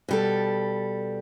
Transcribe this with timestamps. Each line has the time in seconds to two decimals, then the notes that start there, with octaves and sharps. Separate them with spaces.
0.09 B2 G3 A4